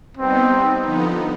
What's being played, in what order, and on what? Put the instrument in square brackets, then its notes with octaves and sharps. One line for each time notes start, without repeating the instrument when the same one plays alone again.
[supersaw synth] G3 B3 D#4 [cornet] C4
[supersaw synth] D3 F3 B3 D#4